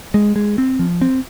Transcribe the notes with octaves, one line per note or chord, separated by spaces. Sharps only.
G#3
G#3
C4
F3
C4